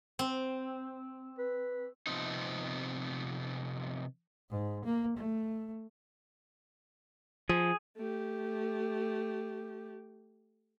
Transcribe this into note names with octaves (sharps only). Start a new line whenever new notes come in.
C4
B4
C3 F3 B3 C4 D#4
G#2
A#3
A3
F3 G#4
A3 G4